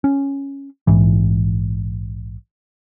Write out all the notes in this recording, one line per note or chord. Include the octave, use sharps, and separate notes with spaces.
C#4
A#1 G#2 E3